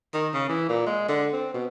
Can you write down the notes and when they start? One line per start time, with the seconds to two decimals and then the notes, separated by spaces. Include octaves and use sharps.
0.14 D#3
0.34 C#3
0.49 E3
0.69 A#2
0.86 G#3
1.08 D3
1.33 C4
1.54 B2